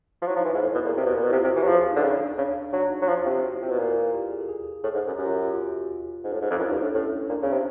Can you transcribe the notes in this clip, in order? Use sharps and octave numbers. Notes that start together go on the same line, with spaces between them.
F3
F#3
E4
F3
D#4
E3
G#2 D#4
A2 E4
B2 E4
A#2 G#4
F#4
C3 G4
B2
A#2
B2
C3 E4
F4
C3
F#4
E3 G4
F#3
F3 G#4
G#4
D#4
D3
C#3 D#4
D4
C#3 D4
F#3 D4
D#4
F#3
F3 F4
C3
F#4
E4
C3 F4
B2
A#2 E4
F4
G4
G#4
A4
G#4
A2 G#4
G#2
F#2
F#2 G4
F4
F#4
F4
F4
G#2
A2
G#2
F2
F#2 E4
G2 D#4
A2 D4
A2 C#4
A#2 D4
C#3 C#4
C3